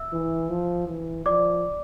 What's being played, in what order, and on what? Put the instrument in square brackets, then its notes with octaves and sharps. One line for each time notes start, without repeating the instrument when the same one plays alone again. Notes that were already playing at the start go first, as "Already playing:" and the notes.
Already playing: [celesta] E5 E6
[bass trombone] E3
F3
E3
[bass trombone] F3 [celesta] D5 D6